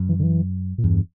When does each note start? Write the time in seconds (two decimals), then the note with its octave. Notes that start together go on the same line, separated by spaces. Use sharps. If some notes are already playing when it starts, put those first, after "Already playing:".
Already playing: F#2
0.09 E3
0.19 D3
0.23 E3
0.78 A#2
0.84 E2 G2